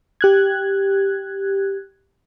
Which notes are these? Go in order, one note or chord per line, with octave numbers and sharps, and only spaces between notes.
G4 F#6 G#6